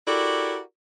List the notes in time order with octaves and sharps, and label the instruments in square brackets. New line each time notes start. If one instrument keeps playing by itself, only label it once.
[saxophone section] E4 F#4 G4 A4 A#4 D5